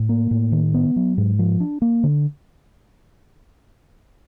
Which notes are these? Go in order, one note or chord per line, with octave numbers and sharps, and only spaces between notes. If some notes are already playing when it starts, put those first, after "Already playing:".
Already playing: A2
A#3
A2
D#3
B3
F#3
G#2
F3
D4
A#3
D3